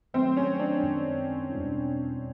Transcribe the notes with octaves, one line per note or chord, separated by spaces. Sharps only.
D#3 F#3 A3 C4
C#4
D4
F#2 D#3 G#3 C#4
E2 B2 G3 B3 E4